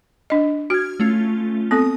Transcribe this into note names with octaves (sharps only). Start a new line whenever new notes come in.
D4 D#5
F#4 F6 G#6
A3 C#4 F4
B3 C4 A4 D#6